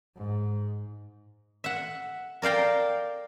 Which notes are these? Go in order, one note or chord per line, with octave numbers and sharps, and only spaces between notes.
G#2
E5 F#5
A#4 D5 F5 G5 A#5